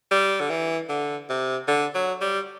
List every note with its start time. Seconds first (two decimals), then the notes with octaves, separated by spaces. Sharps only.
0.11 G3
0.40 D3
0.50 E3
0.89 D3
1.29 C3
1.68 D3
1.94 F#3
2.21 G3